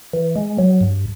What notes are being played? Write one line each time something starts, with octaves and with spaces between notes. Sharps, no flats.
E3
G#3
F#3
G2